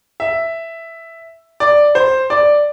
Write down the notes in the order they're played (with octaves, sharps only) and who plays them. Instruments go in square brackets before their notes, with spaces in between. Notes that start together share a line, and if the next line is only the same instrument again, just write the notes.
[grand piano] E5
D5
C5
D5